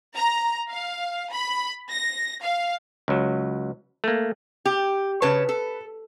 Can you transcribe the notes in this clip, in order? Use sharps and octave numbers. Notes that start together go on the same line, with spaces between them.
A#5
F5
B5
A#6
F5
C#2 F#3
A3 A#3
G4
C#3 B4 C#5 A5
A4